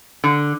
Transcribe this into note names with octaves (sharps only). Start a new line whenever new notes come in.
D3